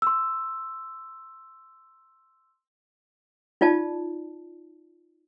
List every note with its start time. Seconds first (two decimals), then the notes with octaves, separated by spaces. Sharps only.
0.02 C6 E6
3.61 D#4 F4 D5 A5